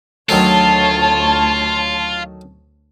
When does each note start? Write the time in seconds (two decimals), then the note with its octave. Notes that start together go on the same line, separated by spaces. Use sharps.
0.29 D2 D#3 F#3 A3 F4 C#5 A5